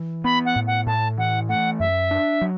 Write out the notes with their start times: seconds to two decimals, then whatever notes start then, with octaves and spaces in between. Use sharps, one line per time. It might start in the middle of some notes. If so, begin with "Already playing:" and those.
Already playing: E3
0.24 B3 B5
0.45 F#5
0.56 A2
0.66 F#5
0.86 A2 A5
1.18 E3 F#5
1.48 A3 F#5
1.79 F#2 E5
2.11 D4
2.41 F#3